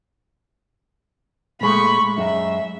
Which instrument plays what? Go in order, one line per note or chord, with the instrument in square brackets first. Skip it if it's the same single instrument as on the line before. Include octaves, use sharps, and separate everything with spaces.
[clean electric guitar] A#2 G#3 A3 [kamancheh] B5 C#6
[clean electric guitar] F#2 G#3 [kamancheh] E5